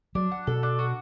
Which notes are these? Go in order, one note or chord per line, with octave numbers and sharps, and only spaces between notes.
F#3 D4
F#5
B2 A4
D4
F#4